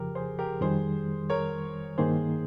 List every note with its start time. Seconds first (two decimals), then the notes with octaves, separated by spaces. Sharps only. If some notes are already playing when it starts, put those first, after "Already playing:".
Already playing: F2 C#3 F3 G4 A#4
0.15 G#4 C5
0.39 G4 A#4
0.61 F2 D#3 G3 G#4 C5
1.30 A#4 C#5
1.98 G2 D#3 A#3 D#4 G#4 C5